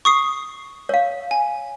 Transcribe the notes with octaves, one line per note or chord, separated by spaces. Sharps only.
C#6 D#6 C7
C#5 F5
G#5